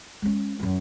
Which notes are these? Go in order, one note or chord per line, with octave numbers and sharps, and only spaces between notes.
G#3 C#4
F#2 E4